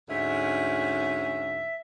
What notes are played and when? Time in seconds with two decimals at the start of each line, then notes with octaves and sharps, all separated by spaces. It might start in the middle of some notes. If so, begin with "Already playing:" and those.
0.09 D2 G#2 C#4 E5